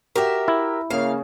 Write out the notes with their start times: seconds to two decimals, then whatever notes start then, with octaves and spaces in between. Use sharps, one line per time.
0.16 F#4 G4 A#4 E5
0.48 E4
0.90 C#3 A#3 F5